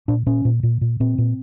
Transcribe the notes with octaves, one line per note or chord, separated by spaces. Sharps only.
A#2 D4
A#2 C#4
A#2
A#2
A#2
A#2 C4
A#2